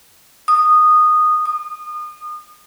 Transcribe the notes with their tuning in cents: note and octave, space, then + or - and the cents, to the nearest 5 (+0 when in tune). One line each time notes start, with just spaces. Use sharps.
D#6 -15
D#6 -35